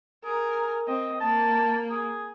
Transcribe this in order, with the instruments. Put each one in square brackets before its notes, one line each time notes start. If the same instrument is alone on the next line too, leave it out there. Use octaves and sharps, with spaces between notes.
[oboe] G#4 [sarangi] A#4
[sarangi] C4 [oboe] D#5
[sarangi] A#3 [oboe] A5
[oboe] G#4